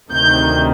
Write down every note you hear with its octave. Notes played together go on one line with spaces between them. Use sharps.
D2 C3 D#3 G6